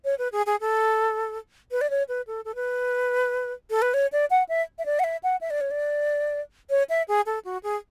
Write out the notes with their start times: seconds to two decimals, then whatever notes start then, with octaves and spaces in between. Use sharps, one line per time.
0.05 C#5
0.18 B4
0.32 G#4
0.46 G#4
0.60 A4
1.71 B4
1.81 D5
1.90 C#5
2.09 B4
2.27 A4
2.45 A4
2.55 B4
3.70 A4
3.82 B4
3.94 C#5
4.12 D5
4.30 F#5
4.49 E5
4.79 E5
4.86 D5
4.99 F#5
5.04 E5
5.23 F#5
5.41 E5
5.50 D5
5.61 C#5
5.71 D5
6.70 C#5
6.89 E5
7.08 G#4
7.26 A4
7.45 F#4
7.63 G#4